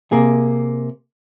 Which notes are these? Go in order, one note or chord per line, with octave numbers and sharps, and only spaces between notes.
C3 A#3 G#4